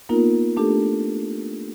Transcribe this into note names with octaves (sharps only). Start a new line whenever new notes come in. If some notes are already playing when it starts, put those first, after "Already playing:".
A#3 B3 D#4 F4 A#4
A3 D4 G4 A4